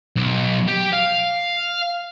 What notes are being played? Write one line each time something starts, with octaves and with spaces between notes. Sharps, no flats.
B1
G4
F5